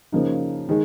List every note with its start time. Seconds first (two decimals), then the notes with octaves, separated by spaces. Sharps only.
0.12 C#3 F3 A#3 D#4
0.69 D#3 G#3